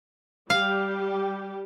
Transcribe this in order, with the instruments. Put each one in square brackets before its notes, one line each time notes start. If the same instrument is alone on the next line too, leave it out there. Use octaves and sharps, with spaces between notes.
[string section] G3 G4 [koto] F5